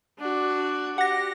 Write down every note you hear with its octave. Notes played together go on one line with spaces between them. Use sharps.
D4 F#4
G4 F#5 A#6